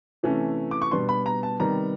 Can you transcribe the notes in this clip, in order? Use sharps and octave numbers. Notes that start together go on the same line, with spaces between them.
C3 E3 A3 C#4
D6
C#6
B2 G3 B3 D4 C6
B5
A#5
A5
C3 D#3 G3 B3 A#5